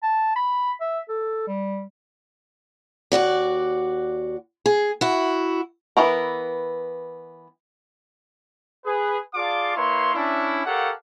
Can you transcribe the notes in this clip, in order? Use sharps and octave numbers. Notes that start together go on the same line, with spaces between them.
A5
B5
E5
A4
G3
D#2 A#2 F#4 D5
G#4
E4 F#4
E3 B3 A#4
G#4 B4
F4 G#4 D5 F5 A5 D6
A#3 E4 B4 C#5 C6
C#4 D4 E4
G4 A4 A#4 C#5 F5 F#5